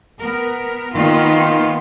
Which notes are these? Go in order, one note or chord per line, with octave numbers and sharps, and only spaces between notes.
B3 A#4
D#3 A#3 B3 F4